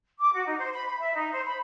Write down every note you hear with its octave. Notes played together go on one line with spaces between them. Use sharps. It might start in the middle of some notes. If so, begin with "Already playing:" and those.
D6
F#4
D#4
C5
B5
B5
E5
D#4
C5
B5